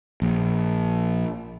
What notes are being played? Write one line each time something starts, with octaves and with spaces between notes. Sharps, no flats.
A#1